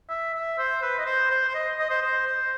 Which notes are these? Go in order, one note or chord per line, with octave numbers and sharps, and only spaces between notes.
E5
E5
C5
B4
D#5
C5
C5
C5
D#5
D#5
C5
C5
C5